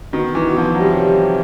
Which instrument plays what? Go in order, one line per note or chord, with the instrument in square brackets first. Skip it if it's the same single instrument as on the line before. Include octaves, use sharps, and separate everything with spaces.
[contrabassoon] B2 [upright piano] D#3
[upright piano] E3
[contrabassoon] B2
[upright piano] F3
F#3
[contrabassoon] C3 [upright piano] G3